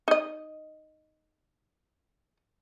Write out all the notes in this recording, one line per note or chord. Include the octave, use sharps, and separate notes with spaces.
D#4 D#5